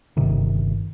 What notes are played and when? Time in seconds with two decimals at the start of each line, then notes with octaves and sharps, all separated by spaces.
0.17 G1 C3 D#3